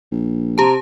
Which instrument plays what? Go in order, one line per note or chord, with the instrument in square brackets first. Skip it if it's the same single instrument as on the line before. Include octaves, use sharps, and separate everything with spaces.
[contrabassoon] A#1
[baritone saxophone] C3 [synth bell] G4 A5 [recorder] A#5